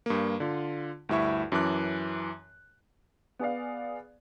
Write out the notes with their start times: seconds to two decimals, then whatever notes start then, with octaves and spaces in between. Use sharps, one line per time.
0.06 G2 A#3
0.40 D3 F4
1.09 D2 G2 E4 E5 C#6
1.52 F#2 E3 A5 D6 F#6
3.39 B3 G#4 D5 F5